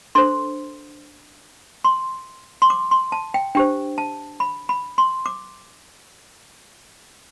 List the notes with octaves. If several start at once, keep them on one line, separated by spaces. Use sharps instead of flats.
D4 A4 C5 C6
C6
C6
D6
C6
A5
G5
D4 G4 C5 G5
A5
B5
B5
C6
D6